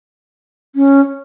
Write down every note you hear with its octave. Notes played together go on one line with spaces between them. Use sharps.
C#4